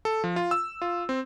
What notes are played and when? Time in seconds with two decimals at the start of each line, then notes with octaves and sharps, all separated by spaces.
0.05 A4
0.24 F3
0.36 F4
0.51 E6
0.82 F4
1.09 C4